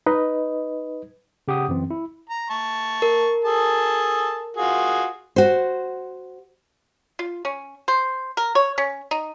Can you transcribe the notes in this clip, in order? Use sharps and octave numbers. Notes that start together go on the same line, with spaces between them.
D#4 B4 D#5
C#3 G4 F#5 D#6
F#2 E3 C4
E4
A#5
A5 C#6
A#4
G#4 A4 A5
F4 F#4 G#4
F#4 C5
F4
C#4
C5
A#4
C#5
C#4
D#4